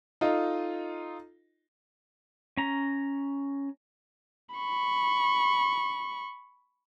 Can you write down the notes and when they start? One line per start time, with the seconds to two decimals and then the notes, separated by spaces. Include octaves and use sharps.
0.21 D#4 F4 A4 D#5
2.57 C#4 A#5
4.56 B5 C#6